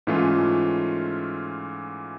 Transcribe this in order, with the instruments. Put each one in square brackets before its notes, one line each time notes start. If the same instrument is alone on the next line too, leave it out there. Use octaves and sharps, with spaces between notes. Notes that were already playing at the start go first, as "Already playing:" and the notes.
[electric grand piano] G#2 E3 A3 C#4 F4